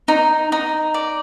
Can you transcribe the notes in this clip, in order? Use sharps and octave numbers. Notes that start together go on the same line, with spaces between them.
D#4
D#4
D5